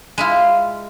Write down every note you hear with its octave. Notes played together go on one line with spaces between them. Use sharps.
G#3 E4 F4